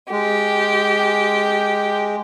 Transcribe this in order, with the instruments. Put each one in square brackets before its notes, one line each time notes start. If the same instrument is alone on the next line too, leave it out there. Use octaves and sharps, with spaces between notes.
[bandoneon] G#3 [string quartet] G4